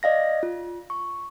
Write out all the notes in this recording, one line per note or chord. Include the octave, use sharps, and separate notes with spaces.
D5 D#5 F5 A#6
F4
C#6